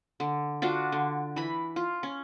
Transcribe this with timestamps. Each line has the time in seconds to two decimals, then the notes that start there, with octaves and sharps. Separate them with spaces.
0.20 D3
0.62 D4 F4 F#4
0.92 D3
1.36 E3 B5
1.76 F4
2.03 C#4